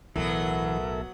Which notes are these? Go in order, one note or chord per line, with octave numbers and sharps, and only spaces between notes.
B1 A2 E3 F#3 B3 A4 A#4 E5